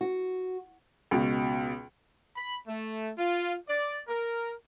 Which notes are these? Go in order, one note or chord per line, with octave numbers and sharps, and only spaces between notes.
F#4
C#2 B2
B5
A3
F4
D5
A#4